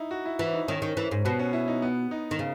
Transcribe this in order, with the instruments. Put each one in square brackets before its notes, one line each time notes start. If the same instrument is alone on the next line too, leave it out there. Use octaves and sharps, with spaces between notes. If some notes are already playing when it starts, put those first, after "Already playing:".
Already playing: [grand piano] D#4 E4
F#4
E4
[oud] E3 [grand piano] E4
[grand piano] D#4
[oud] D#3 [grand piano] C#4
[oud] D#3
E3
G#2
[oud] B2 [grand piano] B3
[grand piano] C#4
E4
D#4
B3
D#4
[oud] D#3
C#3